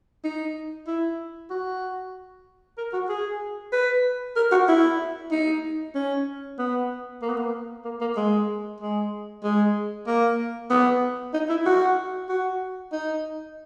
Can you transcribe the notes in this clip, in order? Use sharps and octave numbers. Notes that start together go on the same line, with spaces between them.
D#4
E4
F#4
A#4
F#4
G#4
B4
A#4
F#4
E4
D#4
C#4
B3
A#3
B3
A#3
A#3
A#3
G#3
G#3
G#3
A#3
B3
D#4
E4
F#4
F#4
D#4